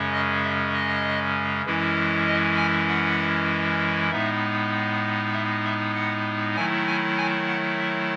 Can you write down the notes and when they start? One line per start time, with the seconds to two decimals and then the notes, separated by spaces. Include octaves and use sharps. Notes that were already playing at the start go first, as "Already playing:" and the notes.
Already playing: F#2 C#3 G#3 C#4
0.12 D#5
0.43 E5
0.74 D#5
1.66 F#2 E3 G#3 C#4 E4
2.27 D#5
2.57 G#5
2.89 F#5
4.11 A2 G#3 B3 D#4 E5
5.33 E5
5.64 E5
5.95 F#5
6.56 D#3 F#3 A3 E4 G#5
6.87 G#5
7.18 G#5
7.48 F#5
7.79 E5